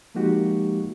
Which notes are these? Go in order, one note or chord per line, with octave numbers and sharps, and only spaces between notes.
F3 G#3 A#3 D#4 F#4 G4